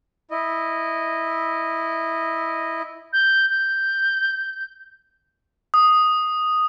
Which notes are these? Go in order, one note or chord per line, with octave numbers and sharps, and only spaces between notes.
E4 D#5
G6
G6
D#6